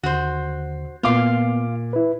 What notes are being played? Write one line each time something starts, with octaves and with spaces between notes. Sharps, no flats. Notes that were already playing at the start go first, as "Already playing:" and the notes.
D#2 D3 F#4 C5
A#2 B3 F4 F5 D6
E4 B4